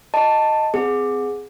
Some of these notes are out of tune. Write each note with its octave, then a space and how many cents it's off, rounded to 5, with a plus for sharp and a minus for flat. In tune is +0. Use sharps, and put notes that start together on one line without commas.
D#5 +0 A5 +10
C4 -30 G#4 +0